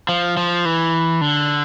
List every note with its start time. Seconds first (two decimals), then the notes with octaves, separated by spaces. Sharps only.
0.09 F3
0.37 F3
0.65 E3
1.21 D3